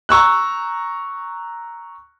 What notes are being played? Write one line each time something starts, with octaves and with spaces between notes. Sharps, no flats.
A#5 C#6 E6 F#6